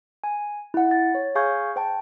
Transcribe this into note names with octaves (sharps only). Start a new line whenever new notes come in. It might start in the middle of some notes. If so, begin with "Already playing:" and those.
G#5
E4 F#5
A6
C#5
G#4 F5 G#5 C#6 G6 G#6
C5 G5 A5